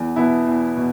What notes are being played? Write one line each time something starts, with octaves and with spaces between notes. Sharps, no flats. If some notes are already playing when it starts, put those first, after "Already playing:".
Already playing: E2
B2 B3 E4
E2
B2